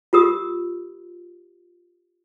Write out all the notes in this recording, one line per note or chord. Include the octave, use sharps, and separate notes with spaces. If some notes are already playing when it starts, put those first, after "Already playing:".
F4 G4 A#4 D#6